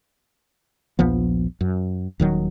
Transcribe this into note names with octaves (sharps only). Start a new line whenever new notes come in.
A#1 D#2 F3 B3
F#2
D#1 D#3 F#3